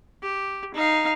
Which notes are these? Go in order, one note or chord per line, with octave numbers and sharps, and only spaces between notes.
G4
D#4 F5